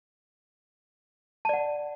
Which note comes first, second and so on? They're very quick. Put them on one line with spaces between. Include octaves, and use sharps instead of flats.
A5 D5 F#5